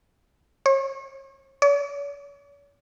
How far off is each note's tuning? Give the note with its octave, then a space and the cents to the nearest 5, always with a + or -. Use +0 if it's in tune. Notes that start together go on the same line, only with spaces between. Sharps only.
C#5 -40
C#5 +45